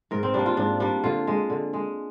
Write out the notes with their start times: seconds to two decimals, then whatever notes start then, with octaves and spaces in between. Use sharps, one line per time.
0.11 G#2 A#4
0.23 C4
0.34 G3 A#3 D4
0.46 F4
0.57 G#2 D4
0.80 G3 A#3 D4
1.04 D3 F4
1.27 G#3
1.50 D3
1.73 G#3